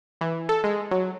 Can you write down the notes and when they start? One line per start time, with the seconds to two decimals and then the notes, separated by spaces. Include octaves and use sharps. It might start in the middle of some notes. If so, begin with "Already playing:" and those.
0.21 E3
0.49 A4
0.64 G#3
0.91 F#3